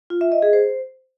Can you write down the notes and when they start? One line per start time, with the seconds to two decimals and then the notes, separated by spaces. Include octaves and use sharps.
0.10 F4
0.21 E5
0.32 D#5
0.42 G#4
0.53 C5